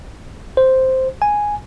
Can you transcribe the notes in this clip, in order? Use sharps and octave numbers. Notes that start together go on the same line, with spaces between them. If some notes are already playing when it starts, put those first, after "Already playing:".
C5
G#5